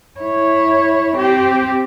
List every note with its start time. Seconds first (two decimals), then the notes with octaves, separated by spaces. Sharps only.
0.21 E4 C#5
1.17 C4 G4